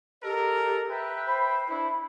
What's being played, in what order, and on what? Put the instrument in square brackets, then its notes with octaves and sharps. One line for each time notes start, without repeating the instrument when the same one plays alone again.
[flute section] G4 D#5 [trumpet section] A4 A#4
[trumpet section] B4 E5 G5 [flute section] F#6
[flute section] C5 B5
[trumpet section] D4 E4 [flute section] B5